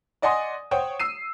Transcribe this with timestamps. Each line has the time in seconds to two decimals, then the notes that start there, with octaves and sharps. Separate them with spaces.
0.22 D5 D#5 F#5 G#5 C6 D#6
0.71 C5 C#5 F#5 G5 D#6
0.99 E6 C7 D#7